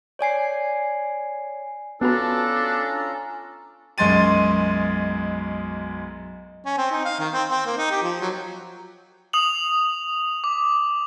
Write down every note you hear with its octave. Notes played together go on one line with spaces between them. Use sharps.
C#5 D5 G#5 C7
B3 C#4 D4 F4 F#4 A4 B4 A#5
B1 F#2 G#3 C6 A6 D#7
C#4
C4
D#4
F5
D#3
C4
C4
A#3
D#4
G4
F3
F#3
D#6 F7 F#7
D6